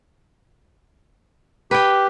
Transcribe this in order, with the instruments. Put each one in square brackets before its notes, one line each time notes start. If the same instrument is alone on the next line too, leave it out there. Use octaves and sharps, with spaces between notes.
[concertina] G4 [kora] B4 G5